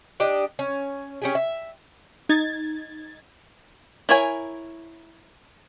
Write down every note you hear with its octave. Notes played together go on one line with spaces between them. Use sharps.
D4 G4 D#5
C#4
C#4 G4 G#4
E5
D#4 G#6 A6
E4 A#4 C#5 G#5